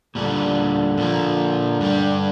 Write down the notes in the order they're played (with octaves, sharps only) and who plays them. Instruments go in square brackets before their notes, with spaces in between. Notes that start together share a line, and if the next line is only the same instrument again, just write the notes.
[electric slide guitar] A#2 G3 D4 [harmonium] D3
[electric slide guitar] A#2 F3 A#3
G2 G3 D4